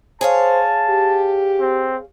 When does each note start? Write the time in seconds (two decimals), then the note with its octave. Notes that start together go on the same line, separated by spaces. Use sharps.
0.21 G#4 C5 C#5 F5 A5
0.89 G4
1.60 C4